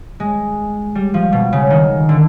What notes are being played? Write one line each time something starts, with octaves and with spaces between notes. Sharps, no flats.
G#3
G3
F3
B2
C#3
D#3
D3